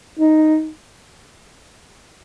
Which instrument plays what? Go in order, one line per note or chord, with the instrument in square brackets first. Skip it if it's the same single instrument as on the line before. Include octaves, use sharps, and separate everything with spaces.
[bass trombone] D#4